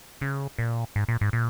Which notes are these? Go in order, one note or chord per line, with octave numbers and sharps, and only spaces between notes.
C#3
A#2
G#2
A#2
G#2
A#2